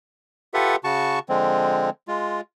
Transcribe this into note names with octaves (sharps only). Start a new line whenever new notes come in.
F4 G4 A4 B4 E5 F#5
C#3 F#4 A5 C#6
D3 F3 G#3 C4
G#3 F4